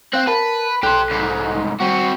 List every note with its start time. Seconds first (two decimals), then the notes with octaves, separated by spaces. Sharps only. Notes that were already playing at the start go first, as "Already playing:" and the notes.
0.13 C4 F5 F#6
0.27 A#4 B4 A5
0.83 B1 G4 A4 C5 F#6
1.10 C2 G#2
1.81 G3 C4 F#4